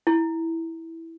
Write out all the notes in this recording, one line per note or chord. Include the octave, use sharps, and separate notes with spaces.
E4